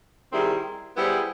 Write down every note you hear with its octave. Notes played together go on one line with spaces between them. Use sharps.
D#3 G3 C4 E4 G#4
G3 B3 E4 G#4 C5